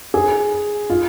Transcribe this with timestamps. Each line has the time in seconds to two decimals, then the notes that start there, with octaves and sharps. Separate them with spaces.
0.14 G#4
0.90 F4